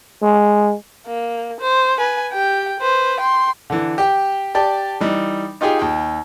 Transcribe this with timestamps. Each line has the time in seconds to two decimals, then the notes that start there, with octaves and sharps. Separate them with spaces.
0.22 G#3
1.07 A#3
1.60 C5
1.98 B4 G#5
2.33 G4 G5
2.80 B4 C5
3.20 G5 C6
3.70 D3 E3
3.98 G4 G5
4.55 G4 D5 A5
5.00 E3 G3 D#4
5.61 D#4 F4 G4 G#4 G5
5.79 D#2 G5